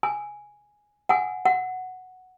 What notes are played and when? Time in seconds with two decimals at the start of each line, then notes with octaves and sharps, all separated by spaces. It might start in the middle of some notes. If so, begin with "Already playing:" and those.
0.03 G#5
1.09 F#5 G#5
1.45 F#5